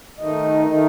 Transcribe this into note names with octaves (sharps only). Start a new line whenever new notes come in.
D#3 A3 D#4 D#5
D#3 A3 D#4